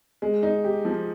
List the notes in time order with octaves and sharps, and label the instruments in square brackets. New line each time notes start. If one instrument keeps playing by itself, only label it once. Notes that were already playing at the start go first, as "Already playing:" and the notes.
[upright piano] G#3
D#4
G4
F3